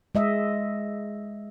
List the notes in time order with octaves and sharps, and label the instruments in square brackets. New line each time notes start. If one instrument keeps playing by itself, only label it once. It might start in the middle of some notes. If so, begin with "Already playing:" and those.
[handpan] G#3 D#5 E5